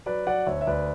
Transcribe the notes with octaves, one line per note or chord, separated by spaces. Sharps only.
F#3 B4 D5
F#3 D5 F#5
D2 C#5 E5
E5
D2 B4 D5